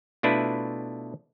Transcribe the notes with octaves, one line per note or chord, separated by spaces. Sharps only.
B2 A3 D4 E4 F4 B4